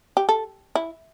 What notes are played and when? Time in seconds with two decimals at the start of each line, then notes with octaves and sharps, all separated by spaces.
0.17 G4
0.29 A4
0.75 E4